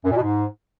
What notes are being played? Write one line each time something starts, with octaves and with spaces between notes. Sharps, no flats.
F#2
A#2
B2
G#2